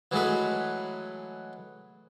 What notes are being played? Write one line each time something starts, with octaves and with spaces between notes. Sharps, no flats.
E3 F#3 G#3 A3 B4